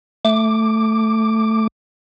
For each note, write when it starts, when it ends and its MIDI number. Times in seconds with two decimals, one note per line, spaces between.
0.25 1.67 57
0.25 1.67 86